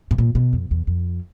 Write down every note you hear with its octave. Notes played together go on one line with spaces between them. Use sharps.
A2
A#2
B2
F2
E2
F2